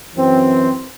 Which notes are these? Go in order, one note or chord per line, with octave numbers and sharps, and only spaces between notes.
F#2 E3 C4